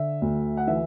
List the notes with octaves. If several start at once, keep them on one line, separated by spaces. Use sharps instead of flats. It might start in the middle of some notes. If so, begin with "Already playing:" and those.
Already playing: D3 E5
D2
F#5
E3 E5